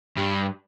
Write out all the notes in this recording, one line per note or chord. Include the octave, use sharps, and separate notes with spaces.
G2